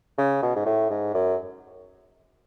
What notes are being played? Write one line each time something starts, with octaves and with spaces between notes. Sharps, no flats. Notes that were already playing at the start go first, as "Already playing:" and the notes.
C#3
B2
G#2
A2
G#2
F#2